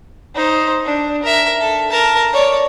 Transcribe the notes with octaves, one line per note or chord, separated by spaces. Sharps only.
D#4 C5
D4
A#4 E5
A4
A#4 A5
C#5 D5